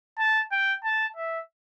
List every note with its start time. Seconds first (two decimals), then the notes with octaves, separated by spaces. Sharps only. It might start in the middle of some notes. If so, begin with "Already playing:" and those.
0.19 A5
0.51 G5
0.84 A5
1.16 E5